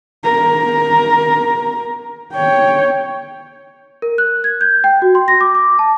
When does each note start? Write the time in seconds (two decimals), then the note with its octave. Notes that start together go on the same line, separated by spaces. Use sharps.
0.25 A#4
2.33 C#5 G5
4.02 A#4
4.18 F#6
4.44 G#6
4.61 G6
4.84 G5
5.02 F#4
5.15 C6
5.28 A#6
5.41 D6
5.55 D6
5.79 A5